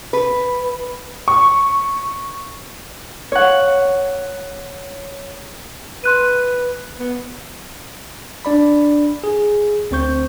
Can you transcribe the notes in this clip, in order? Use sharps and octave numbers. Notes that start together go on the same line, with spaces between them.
B4
C#6
C#5 F#5
B4 C6 F#6 D#7
B3
D4 D5 B5
G#4
D2 C4 C5 C#6 G6